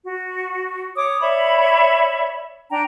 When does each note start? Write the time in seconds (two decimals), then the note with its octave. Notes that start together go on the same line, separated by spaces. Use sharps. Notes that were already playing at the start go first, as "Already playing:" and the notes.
0.04 F#4
0.96 C#5 D6 D#6
1.21 C#5 D5 E5 B5
2.70 D4 G5 A#5